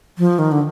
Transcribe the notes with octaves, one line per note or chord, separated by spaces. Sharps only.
F3
D#3
D3